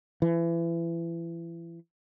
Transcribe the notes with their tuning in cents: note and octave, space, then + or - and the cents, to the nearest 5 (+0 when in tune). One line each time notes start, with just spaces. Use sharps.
E3 +30